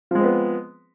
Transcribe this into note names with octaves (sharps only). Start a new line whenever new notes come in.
F3 G#3 B3 C4